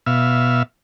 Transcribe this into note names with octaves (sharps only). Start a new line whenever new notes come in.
B2 E5 F5